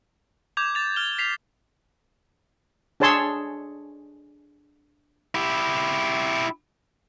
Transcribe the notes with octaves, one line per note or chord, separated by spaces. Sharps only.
D6 G6 G#6 F7
A6 F7
F6 G7
B6 C7 F7
D4 G#4 C#5 A5 C6 E6
E4 G4